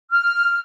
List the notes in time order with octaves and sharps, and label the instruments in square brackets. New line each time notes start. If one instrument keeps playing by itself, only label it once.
[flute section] F6